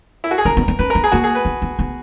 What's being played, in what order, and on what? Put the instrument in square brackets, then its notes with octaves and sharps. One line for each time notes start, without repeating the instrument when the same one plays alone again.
[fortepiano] E4
F#4
G#4
[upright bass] C#4 [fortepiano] A#4
[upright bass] B3
B3
[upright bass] C#4 [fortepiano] B4
[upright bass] B3 [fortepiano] A#4
[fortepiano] G#4
[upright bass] A#3 [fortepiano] F#4
[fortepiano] G#4
B4
[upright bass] B3
B3
B3